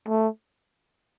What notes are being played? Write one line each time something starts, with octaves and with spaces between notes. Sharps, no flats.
A3